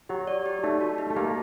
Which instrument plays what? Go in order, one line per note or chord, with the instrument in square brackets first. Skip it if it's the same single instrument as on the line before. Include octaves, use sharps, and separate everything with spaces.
[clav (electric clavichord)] F#3 [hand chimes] G4
[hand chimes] D5
G4
[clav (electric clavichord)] A3 [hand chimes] D#4
[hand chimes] F#4
D#4
[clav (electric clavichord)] A3
[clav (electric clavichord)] A#3 [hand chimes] G4